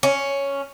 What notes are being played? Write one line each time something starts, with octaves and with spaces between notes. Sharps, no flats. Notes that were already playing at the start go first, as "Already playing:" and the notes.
C#4